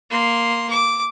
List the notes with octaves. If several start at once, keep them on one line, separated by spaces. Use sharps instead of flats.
A#3 C6
D6